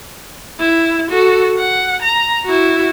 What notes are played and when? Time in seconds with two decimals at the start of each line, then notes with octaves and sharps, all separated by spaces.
0.60 E4
1.10 F#4 A4
1.58 F#5
2.02 A#5
2.45 E4 F#4